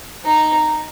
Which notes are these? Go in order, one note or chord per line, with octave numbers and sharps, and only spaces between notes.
D#4